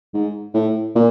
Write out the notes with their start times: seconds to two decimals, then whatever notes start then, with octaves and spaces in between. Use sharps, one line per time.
0.14 G#2
0.54 A2
0.95 A#2